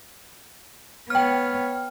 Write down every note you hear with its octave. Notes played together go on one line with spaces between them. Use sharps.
B3 C#5 G5 F6